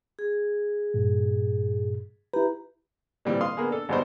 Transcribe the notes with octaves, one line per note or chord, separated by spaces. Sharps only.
G#4
G2 A#2
E4 G4 B4 A#5
A#2 E3 G3 C4
F5 C6 D#6
A#3 B3 G#4
D4 A4
G#1 F#3 G3 B3 F#4 C5